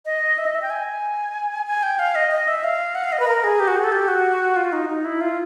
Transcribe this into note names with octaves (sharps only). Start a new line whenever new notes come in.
D#5
E5
D#5
E5
G5
G#5
G#5
G5
F5
D#5
D#5
E5
F5
F#5
F5
D#5
B4
A#4
G#4
G4
F#4
G#4
A4
G4
F#4
F4
D#4
D#4
E4
F4